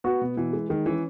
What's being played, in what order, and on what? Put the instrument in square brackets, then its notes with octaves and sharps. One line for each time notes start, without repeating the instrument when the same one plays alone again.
[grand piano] B3 [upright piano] F#4
[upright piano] B2
[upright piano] B2 [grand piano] E3
[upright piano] G#3
[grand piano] D#3 [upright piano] G#3
[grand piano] E3 [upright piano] C#4